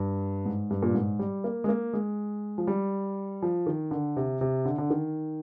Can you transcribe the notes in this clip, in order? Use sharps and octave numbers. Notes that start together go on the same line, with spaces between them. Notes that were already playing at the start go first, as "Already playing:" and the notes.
Already playing: G2
G#2
G2
A#2
G#2
G3
A#3
G#3
A#3
G#3
F3
G3
F3
D#3
D3
C3
C3
D3
D3
D#3